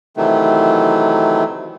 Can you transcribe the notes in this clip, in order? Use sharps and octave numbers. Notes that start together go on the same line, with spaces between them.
C3 D#3 E3 F#3 A3